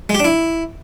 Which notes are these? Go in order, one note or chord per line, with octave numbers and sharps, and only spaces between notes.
G#3
G4
D4
E4